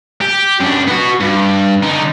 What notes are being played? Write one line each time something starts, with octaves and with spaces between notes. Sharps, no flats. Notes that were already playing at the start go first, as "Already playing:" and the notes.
G4
F#2 D4
B3 F#4
G2
D3 D#4